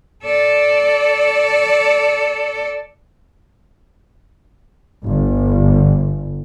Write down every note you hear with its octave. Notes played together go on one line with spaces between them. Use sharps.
A4 D5
G1